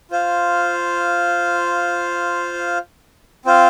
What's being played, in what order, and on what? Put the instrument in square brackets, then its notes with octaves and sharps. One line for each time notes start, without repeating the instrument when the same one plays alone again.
[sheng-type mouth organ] F4 C5 F5
C4 F4 C5 F5